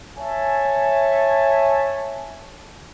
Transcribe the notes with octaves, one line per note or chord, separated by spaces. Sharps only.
C#5 E5 G#5 A5